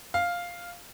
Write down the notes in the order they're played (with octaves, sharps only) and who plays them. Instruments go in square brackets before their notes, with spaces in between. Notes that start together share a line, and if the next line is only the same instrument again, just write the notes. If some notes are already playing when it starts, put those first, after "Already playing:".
[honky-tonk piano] F5